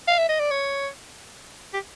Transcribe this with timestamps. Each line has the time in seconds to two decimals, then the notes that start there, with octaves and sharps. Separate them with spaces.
0.07 F5
0.18 E5
0.29 D#5
0.39 D5
0.50 C#5
1.73 G4